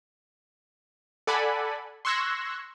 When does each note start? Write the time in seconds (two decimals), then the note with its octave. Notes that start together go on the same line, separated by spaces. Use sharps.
1.27 A4 D5 F#5 G#5 B5
2.05 C6 C#6 E6 F#6 G#6 A#6